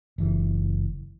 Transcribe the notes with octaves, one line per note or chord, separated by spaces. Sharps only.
F#1 E3